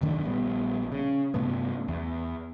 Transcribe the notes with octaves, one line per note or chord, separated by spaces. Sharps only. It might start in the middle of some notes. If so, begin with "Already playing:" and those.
F#1 D2 D#3 D4
A#1 G3 B3
C#3
G2 C3 A3 B3
E2